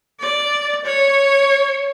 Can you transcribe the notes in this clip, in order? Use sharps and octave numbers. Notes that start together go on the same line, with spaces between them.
D5
C#5